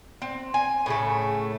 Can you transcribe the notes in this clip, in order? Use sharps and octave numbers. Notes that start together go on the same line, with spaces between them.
C4
G#5
A2 C#3 A3